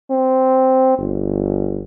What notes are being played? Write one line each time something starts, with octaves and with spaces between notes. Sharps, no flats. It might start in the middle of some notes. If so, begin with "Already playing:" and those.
C4
G1